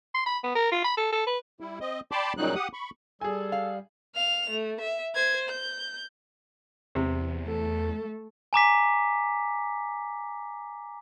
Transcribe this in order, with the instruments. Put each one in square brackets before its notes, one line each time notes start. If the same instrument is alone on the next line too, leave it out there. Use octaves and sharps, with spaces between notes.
[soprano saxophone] C6
B5
B3
A#4
F4
B5
A4
A4
B4
[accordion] G3 E4
C4 D#5
D5 G5 A5 B5 C6 D6
A#2 C#3 F#3 G3 D#4 F#6
G4 F#5 D#6
B5 C#6
[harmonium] G3 [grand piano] G#4 G#5 [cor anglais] A4
[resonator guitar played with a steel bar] F5
[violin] F5 F7
A3
E5
C5 G#6
G6
[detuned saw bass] E2 [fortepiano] C3
[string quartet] A3 A4
[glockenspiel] G#5 A#5 D6 B6